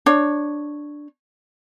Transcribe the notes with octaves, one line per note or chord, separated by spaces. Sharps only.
D4 C#5